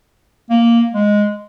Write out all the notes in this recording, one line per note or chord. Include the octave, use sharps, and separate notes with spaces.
A#3
G#3